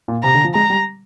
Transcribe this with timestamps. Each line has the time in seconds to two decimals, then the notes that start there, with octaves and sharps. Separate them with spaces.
0.08 A#2
0.23 C3 A#5
0.35 D3
0.44 F3
0.55 G#3 A#5
0.70 G3